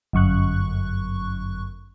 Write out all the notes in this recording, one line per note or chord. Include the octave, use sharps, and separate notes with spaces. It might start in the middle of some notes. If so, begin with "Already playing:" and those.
G1 F#2 C#6 F#6